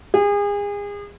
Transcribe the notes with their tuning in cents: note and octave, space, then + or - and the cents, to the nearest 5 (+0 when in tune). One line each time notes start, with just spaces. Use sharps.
G#4 -35